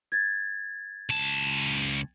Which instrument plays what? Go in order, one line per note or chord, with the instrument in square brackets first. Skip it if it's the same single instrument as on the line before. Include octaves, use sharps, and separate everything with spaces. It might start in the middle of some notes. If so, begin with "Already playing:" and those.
[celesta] G#6 A6
[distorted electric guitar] C#2 A5